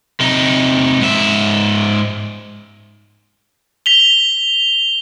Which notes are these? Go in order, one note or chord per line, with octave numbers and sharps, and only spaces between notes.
C3 D#4
G#2 E5
B6 F7 G7